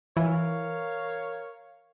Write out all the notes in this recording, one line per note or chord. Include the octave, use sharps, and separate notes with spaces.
E3 A#4 C#5 F5